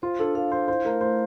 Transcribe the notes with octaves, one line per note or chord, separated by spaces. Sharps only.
F4 C5
D4 A4
A4 F5
C5 F5
E4 C5
A3 A#4
A3 C5